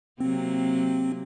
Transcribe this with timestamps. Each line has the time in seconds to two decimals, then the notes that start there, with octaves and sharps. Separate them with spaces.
0.20 C3 F#3 A#3 C4